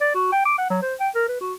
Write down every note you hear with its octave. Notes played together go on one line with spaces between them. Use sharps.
D5
F#4
G5
D6
F#5
F#3
C5
G5
A#4
B4
F#4